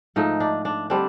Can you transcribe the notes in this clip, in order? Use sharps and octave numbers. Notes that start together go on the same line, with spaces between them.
G#2 F3 A3 D#4
D4
D4
D3 G3 C4 D4